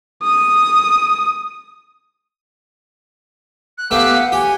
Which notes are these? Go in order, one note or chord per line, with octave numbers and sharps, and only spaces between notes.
D#6
F#6
A3 B3 G4 F5 D6 F#6
F#5
G4 G#5